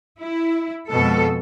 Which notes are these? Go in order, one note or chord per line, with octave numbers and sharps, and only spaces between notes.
E4
F2 B2 G#3 A4